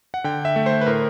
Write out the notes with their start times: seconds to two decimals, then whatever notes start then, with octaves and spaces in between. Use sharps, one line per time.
0.14 F#5
0.24 D3 G5
0.45 E5
0.56 A3
0.66 C5
0.81 B4
0.87 A2 A#4